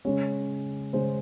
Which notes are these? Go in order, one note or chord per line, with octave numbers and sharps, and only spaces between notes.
C#3 G#3 C#4 C#5
C#3 G#3 C#4 C5